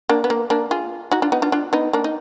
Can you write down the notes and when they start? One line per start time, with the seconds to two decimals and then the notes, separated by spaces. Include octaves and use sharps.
0.09 A#3 D4
0.24 B3
0.30 A#3
0.50 A#3 D4
0.71 F4 G#4
1.11 D#4 F#4
1.22 D4 F4
1.32 B3 D#4
1.42 D4 F4
1.52 D4 F4
1.73 B3 D#4
1.93 A#3 D4
2.04 D#4